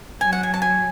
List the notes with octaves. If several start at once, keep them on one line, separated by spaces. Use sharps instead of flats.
F#3 G#5
F#5
G#5
A5
G#5